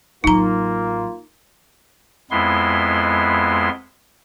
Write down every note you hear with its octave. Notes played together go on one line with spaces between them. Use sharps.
A1 F#3 A#3 D#4 F4 A#5
F2 G#3 B3 E4 C6